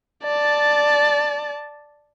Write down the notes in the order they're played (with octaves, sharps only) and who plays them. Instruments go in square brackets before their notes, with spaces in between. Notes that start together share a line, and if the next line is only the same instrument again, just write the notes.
[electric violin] D5 A5